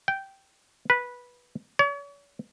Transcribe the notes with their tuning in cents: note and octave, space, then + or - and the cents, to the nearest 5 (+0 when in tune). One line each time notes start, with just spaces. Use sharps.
G5 -10
B4 -10
C#5 +40